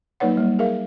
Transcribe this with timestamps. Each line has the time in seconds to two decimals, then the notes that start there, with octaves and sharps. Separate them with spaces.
0.20 F#3 A#3 D#4 B4 C#5 F#5
0.37 G3 A#3
0.59 G#4 A#4 E5 F5